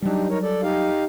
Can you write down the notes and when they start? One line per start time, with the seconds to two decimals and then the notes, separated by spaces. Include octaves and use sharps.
0.02 F#3 G3 D4 D#4 G4
0.29 D#4 A#4 C#5
0.42 A4 D5
0.62 D#4 G4 F5